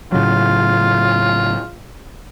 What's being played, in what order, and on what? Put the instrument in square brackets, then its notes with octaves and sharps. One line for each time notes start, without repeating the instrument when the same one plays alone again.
[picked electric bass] A2 C#3 F#3 [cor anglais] F4